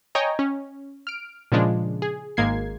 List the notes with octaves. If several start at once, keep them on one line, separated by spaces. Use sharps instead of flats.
C#5 D#5 G5 G#5 A#5
C#4
F6 D7
A#2 C#3 F3 G#3 D4
G#4
G#1 G#2 G#3 A#3 G#6 C7